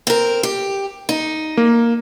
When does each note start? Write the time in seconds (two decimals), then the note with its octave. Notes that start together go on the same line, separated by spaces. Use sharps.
0.07 C4 A#4
0.43 G4
1.09 D#4
1.57 A#3